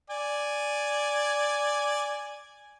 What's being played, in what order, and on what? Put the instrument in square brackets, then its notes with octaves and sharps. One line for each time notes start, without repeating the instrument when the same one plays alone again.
[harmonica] D5 G#5